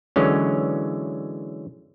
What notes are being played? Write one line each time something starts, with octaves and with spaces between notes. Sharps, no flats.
D3 E3 F#3 G#3 C#4